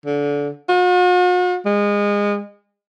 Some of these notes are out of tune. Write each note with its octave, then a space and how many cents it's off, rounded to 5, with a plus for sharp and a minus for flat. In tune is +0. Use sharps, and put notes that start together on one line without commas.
D3 -25
F#4 -45
G#3 -25